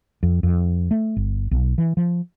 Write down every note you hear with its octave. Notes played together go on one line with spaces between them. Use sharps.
F2
F2
A3
G1
B1
E3
F3